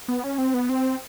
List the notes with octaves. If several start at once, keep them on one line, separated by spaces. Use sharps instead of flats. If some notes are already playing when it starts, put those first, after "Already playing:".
B3
C#4
C4
B3
C4